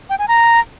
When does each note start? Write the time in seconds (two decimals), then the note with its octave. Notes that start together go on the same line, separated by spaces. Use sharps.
0.10 G5
0.19 G#5
0.28 A#5